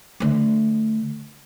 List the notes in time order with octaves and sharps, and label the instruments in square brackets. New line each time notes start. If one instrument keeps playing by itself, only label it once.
[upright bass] D3 A3